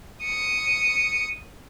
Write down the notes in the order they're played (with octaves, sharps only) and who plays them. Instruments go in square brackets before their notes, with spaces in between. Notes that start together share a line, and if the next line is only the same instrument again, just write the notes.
[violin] D#6 C#7